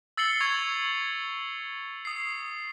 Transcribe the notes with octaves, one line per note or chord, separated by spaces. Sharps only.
E6 A6 C7 C#7 F#7 G7
C#6 G#6 F7
D#6 C7